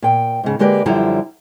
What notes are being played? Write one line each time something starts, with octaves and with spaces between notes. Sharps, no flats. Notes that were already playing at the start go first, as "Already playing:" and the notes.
A#2 G5
G#2 C#3
D3 G#3 A#3 G4 B4 D5
F#2 D3 F3 G3 E4 A#5